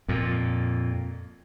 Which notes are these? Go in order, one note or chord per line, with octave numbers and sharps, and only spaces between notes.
F2 A#2